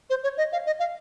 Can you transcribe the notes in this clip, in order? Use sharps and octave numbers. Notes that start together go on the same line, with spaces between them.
C5
C#5
D#5
F5
D#5
F5